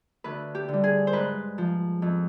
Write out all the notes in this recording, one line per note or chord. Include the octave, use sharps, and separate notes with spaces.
D2 B4
G4
D3 G3
G#4
C5
G#2 B4
F3
F2